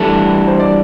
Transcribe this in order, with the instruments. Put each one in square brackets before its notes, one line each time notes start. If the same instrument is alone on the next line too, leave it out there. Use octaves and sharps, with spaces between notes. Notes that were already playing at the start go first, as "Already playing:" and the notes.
Already playing: [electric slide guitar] E3 G3 D4 [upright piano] A3 A4
[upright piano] C5
D5